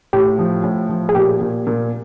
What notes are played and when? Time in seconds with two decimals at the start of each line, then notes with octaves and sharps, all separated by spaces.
0.13 A2 G4
0.39 F3
0.64 A2
0.89 F3
1.09 G#4
1.15 A#2 G4
1.41 A#2
1.67 A#2